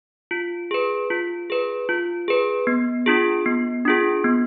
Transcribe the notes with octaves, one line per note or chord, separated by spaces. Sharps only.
F4
G#4 B4
F4
G#4 B4
F4
G#4 B4
B3
D4 F4 G#4
B3
D4 F4 G#4
B3